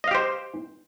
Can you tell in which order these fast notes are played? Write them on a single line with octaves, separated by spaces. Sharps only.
D#5 F5 G4 C5